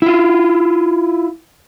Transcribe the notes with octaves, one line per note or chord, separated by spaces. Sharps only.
E4 F4